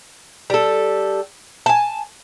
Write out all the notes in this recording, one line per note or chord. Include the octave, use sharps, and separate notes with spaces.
G3 A4
G#5 A5